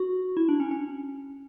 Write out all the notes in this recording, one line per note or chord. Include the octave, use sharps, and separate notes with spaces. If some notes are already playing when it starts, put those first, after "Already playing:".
Already playing: F#4
E4
D4
C#4
C#4